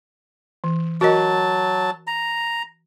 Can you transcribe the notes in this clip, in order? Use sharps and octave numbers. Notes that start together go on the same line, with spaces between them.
E3
F#3 F#4 A#4 D#5 A5
A#5